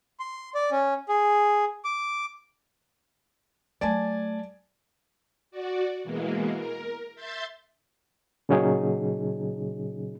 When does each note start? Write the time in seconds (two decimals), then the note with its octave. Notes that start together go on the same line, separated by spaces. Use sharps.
0.20 C6
0.55 D5
0.71 C#4
1.09 G#4
1.85 D6
3.81 F#3 A3 D5 G#5 A5
5.51 F#4 D5
6.04 B2 E3 G#3 A#3
6.52 A#4
7.15 E5 C6 G6 A6
8.49 A#2 C#3 F#3 C#4 D#4 G#4